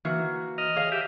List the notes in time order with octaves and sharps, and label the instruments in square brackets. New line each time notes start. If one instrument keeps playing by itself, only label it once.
[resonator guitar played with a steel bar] E3 A#3 F#4
[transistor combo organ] D#5 F6
[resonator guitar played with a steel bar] G#4 C#5 F5
[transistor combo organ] G4 E5